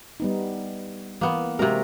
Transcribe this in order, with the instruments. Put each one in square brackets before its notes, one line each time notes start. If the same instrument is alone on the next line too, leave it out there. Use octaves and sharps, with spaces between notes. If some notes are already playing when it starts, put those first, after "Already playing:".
[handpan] G3 B3 D#4
[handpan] E3 [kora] A#3 B3
[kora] C3 A#4 [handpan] G#3 C4 F#4